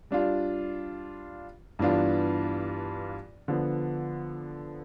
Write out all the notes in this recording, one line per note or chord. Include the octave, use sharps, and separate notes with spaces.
G3 D4 F4
G2 E3 B3 D4 F4
D3 F3 B3